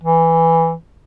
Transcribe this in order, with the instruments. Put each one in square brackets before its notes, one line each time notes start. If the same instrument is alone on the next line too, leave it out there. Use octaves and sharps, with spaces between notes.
[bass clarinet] E3